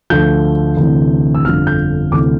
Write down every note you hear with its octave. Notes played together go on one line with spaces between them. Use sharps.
D2 D3 F3 G6
D2 C3 E3
E6
G1 F2 D3 F3 F6
G6
D2 C3 E3 D6